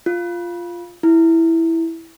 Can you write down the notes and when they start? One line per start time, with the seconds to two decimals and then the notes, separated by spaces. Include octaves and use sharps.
0.06 F4
1.03 E4